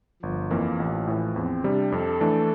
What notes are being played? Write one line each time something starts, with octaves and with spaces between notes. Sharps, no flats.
G1 F3
F2 E3 A#3
A1
A2 E3
E2 C4
C3 G3 D4
F2 A4
E3 A3 D4